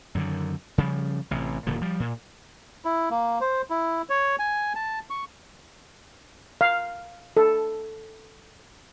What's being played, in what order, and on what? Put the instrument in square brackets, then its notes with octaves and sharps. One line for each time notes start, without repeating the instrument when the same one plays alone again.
[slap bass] F#2 D3 D#3
C#3 F3 G3
A1 C3
D#1 A#2 D3 F3
F3 G3
A#2
[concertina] E4
A#3
C5
E4
C#5
G#5
A5
C#6
[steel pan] F5
A4